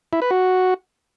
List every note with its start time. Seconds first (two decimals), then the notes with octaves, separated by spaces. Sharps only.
0.13 E4
0.22 B4
0.31 F#4